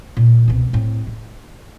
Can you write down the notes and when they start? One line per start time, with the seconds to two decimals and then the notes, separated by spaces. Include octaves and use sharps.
0.17 A#2 A#3
0.48 C2 B2
0.73 A2 C4
1.07 D#4